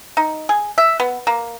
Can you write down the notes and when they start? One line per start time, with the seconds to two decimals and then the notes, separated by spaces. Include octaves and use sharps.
0.17 D#4
0.49 G#4
0.78 E5
1.00 B3
1.27 A#3